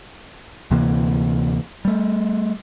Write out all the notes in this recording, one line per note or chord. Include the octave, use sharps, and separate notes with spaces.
D2 C3 E3 A#3
G3 A3